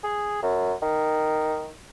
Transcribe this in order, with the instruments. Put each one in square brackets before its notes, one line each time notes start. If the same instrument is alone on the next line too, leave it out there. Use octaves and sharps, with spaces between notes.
[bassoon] G#4
F#2
D#3